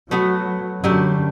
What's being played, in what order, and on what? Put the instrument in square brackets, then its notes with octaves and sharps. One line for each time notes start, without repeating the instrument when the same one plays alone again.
[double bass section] F#3 [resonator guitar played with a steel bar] A3 B3 F#4
[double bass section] F#2 D3 [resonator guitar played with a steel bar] F#3 G3 A3